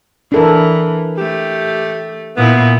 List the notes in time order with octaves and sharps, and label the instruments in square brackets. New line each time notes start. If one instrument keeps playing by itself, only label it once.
[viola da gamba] E3 [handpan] D4 A4 A#4
[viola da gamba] A3 [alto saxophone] G4
[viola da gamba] A#2 E4 [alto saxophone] B3